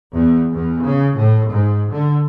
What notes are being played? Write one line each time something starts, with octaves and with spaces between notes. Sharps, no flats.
E2
E2
C#3
A2
G#2
D3